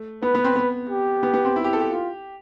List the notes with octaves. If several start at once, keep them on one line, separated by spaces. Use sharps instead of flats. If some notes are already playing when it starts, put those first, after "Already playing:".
Already playing: A3
B3 B4
B3
C4
B3
G4
B3
B3
C4
E4
G4
A4
G4
F4